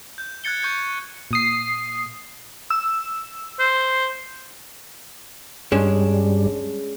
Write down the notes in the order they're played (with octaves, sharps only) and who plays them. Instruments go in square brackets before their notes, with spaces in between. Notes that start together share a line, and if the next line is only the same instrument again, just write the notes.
[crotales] G6
F#6 G#6 A6 C#7 G7
C#6 G6 G#6 C#7
[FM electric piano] A#2 D#6 C7
E6
[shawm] C5
[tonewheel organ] G2 G3 [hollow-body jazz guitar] G#3 C#4 D4